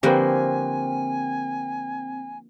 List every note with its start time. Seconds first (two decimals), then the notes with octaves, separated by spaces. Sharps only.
0.03 D3 F3 A#3 C4 G4 B4 C5 G#5